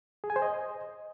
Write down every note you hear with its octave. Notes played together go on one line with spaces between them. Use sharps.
G#4
G#5
C5
D#5